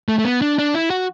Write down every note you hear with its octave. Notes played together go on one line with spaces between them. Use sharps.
A3
A3
B3
D4
D4
E4
F#4